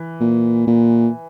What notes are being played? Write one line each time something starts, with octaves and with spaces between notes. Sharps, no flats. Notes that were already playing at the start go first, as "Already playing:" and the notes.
Already playing: E3
A#2
A#2